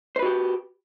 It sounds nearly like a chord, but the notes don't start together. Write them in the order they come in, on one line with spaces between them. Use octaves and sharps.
C5 B4 F#4 G4